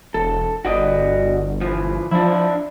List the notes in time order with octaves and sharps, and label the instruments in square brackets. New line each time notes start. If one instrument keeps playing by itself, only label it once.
[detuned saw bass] E1 [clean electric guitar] A4
[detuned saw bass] G1 [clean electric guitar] F#4 D5 D#5
[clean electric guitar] E3 F3
[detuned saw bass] F3 [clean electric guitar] D4 E4